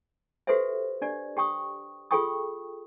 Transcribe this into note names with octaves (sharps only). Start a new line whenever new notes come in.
F#4 G4 A4 B4 C5 E5
D4 G4 D5
G4 G5 C#6 D#6
F4 G#4 A4 G5 C#6 D#6